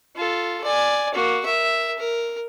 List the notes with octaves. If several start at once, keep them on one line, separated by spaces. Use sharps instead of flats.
F4 A4
D5 G#5
A#3 F#4
A#4 E5
A#4